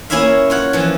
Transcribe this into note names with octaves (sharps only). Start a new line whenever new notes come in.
A#3 C#4 E4 C#5 E5 F5
F4 C#5 F#5
E3 F3